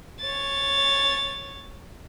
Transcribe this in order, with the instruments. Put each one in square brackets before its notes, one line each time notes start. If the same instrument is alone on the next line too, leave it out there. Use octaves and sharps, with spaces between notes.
[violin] C#5 A6